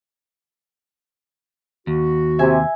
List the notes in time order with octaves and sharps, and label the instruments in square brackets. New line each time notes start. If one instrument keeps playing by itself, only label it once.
[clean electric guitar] D#2 [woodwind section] F#4
[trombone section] C3 [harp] E5 G#5